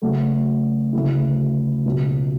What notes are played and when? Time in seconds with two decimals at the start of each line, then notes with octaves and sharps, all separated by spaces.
0.02 C#3 F#3 A3
0.93 D2 C#3 F#3 A3 E4
1.86 C#2 B2 F#3